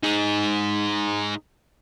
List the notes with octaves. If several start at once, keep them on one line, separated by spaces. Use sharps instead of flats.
D#4 G#4